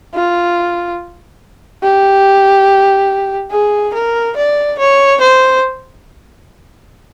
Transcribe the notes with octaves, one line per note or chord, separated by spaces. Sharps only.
F4
G4
G#4
A#4
D5
C#5
C5